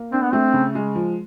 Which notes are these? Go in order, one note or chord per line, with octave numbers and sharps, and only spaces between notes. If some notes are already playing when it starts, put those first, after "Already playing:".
Already playing: A#3
C4 D4
B3
A3 C4
C#3
G#3
F3